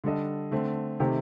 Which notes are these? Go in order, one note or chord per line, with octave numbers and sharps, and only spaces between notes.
D3 G3 D4 A4 D#5
D3 A3 C4
C3 D#3 A3 C4 G4